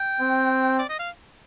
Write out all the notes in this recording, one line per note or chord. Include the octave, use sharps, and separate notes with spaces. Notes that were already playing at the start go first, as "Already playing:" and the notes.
Already playing: G5
C4
D5
D#5
F5